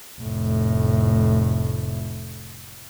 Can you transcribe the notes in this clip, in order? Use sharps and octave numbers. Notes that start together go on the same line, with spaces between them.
F1 A2